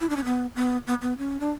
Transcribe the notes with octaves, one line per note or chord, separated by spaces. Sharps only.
E4
D4
C#4
B3
B3
B3
B3
C#4
D4